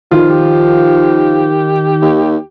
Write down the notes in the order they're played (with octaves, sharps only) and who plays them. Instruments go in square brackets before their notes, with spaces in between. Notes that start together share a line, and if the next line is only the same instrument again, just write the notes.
[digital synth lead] D#3 [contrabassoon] F3 [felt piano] F4
[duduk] G4
[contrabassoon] D#2